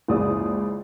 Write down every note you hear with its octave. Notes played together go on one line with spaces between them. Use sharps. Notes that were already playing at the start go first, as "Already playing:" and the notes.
F#1 C#2 F3 G#4 D5 D#6